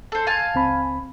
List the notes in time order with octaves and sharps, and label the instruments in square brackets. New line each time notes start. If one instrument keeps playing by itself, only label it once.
[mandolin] A4 C5
F5 G#5 A5
[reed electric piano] C#2 C4 B5